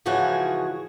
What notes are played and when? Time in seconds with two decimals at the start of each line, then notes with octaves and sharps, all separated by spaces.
0.06 G#2 C#3 E3 F3 F#4 G#4